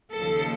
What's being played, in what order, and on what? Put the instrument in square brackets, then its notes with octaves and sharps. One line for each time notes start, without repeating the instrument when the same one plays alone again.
[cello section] D#2 C#3 F3 A4